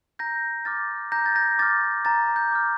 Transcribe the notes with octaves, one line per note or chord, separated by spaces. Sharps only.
A#5 G6 A#6
D6 F6 A6
A#5 G6 A#6
A6
G6 A#6
D6 F6 A6
A#5 A6
G6
D6 F6